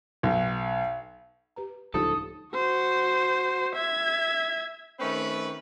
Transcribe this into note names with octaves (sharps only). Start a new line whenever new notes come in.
B1
G4 B4 A#5
D1 C#2 F3 D4 D#4 G4 A4 D#6
F#4 C5
E5 G#6
D#3 A3 C4 C#4 B4